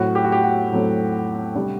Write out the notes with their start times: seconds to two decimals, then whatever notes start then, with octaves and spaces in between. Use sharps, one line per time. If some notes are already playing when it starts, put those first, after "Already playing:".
Already playing: A2 F#3 A3 C4 F#4
0.15 G4
0.25 F#4
0.32 G4
0.43 F#4
0.71 A2 F#3 A3 C4
1.55 C3 G3 D4